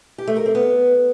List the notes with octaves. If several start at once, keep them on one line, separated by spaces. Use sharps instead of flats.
G4
A3
A#4
C4
B3